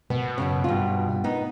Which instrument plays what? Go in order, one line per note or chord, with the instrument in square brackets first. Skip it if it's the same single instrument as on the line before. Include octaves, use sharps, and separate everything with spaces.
[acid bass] B2 [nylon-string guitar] B3
[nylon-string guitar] F#2 A2 C#3
G2 F4
B3 D#4